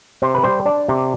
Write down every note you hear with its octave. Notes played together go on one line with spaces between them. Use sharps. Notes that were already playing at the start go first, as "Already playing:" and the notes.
C3 C5
B4
G3 C5
D4 D5
C3